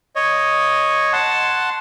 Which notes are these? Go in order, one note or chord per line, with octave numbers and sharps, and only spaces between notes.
C#5 D#5
F#5 A5 C6